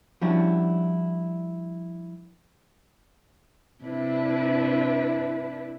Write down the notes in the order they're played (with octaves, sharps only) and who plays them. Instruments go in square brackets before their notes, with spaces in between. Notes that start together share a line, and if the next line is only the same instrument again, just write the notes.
[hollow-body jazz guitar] F3 G3 C#4 D4 E4 F#4
[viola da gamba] C3 [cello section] D4 E4 B4